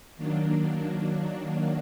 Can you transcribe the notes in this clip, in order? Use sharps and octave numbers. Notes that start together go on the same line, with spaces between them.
D#3 F#3 A#3 D4